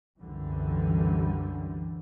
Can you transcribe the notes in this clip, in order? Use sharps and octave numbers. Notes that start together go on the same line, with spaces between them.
C2 F#2 D3 E3 G3